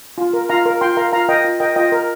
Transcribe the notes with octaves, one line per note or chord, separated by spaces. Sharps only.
F4
A#4
F4 F5 A#5
A#4
F4 G5 C6
A#4 F5 A#5
F4 F5 A#5
A#4 D#5 G5
F4
A#4 D#5 G5
F4 D#5 G5
A#4